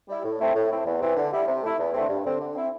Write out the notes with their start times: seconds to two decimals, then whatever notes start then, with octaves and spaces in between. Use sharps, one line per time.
0.08 G3 E4
0.24 A2
0.39 A3 C4 E4
0.56 A2
0.71 A3 C4 E4
0.86 E2
1.02 C3 E3 C4
1.17 D3
1.32 G3 E4
1.48 C3
1.63 A3 E4
1.79 E2
1.94 D3 A3 C4
2.10 G2
2.25 D3 C4
2.41 D3
2.56 C4 E4